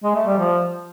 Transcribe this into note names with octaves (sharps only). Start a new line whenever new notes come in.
G#3
A3
G3
F3